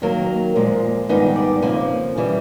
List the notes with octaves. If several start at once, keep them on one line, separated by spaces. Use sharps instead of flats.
D#3 F#3 A#3 A#4
A#2 F3 G#3
G#2 D#3 G3 B3 D#4 B4
D5
F2 C#3 F3 A#3 G#5
C#3 E3 G3